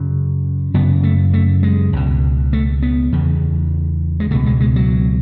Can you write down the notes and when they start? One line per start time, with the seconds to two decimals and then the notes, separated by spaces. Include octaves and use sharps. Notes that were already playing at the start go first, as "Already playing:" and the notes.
Already playing: F#2 C#3
0.74 F#2 C#3 B3
1.03 A3
1.33 A3
1.63 G#3
1.93 C#2 B2
2.53 A3
2.82 B3
3.12 E2 C#3
4.20 G#3
4.31 C#2 B2 A3
4.46 G#3
4.60 G#3
4.76 F#3